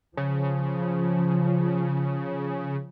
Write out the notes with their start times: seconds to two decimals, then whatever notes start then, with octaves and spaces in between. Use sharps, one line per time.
0.17 C#3 F3